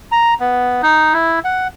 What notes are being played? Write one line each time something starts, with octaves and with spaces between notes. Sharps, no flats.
A#5
B3
D#4
E4
F#5